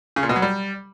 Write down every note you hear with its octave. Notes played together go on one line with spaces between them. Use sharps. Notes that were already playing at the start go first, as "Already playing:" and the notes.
C#3
A#2
B2
F#3
G3